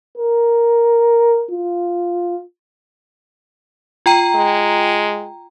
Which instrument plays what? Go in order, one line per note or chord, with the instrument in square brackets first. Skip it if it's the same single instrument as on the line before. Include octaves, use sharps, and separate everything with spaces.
[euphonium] A#4
F4
[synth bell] F4 G5 A#5
[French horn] G#3